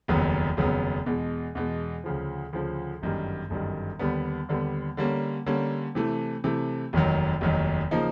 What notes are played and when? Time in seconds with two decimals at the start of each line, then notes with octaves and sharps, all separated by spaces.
0.08 F1 D#2 C#3 F#3 B3
0.57 F1 D#2 C#3 F#3 B3
1.06 E2 B2 G#3
1.55 E2 B2 G#3
2.04 D2 C#3 F3
2.53 D2 C#3 F3
3.02 G1 F#2 D#3 G3
3.50 G1 F#2 D#3 G3
3.99 D#2 D3 G3 B3
4.49 D#2 D3 G3 B3
4.97 D3 G3 A#3 C#4
5.46 D3 G3 A#3 C#4
5.95 C3 E3 A3
6.44 C3 E3 A3
6.93 F1 D#2 D#3 F#3
7.41 F1 D#2 D#3 F#3
7.91 C#3 F3 A#3 D#4